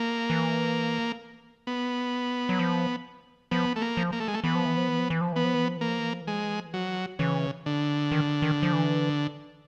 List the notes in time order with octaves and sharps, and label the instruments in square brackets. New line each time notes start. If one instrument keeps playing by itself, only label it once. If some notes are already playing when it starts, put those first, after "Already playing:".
Already playing: [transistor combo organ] A#3
[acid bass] E3
[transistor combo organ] B3
[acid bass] F#3
F3
[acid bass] F3 [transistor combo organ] B3
[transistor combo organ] A3
A#3
[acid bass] F3
[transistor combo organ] A#3
A3
G#3
A3
[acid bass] E3 [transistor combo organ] B3
[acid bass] F3
E3
F3
E3
F3
E3
F3
[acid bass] E3 [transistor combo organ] B3
[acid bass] F3
E3
F3
[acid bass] E3 [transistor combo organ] A#3
[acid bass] F3
E3
F3
E3
[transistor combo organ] G#3
[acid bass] F3
E3
F3
E3
[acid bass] F3 [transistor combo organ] F#3
[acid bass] E3
[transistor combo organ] C#3 [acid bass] E3
[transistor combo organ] D3
[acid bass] D#3
D#3
F3
E3